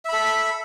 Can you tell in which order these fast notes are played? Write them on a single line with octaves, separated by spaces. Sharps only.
E5 B5 A4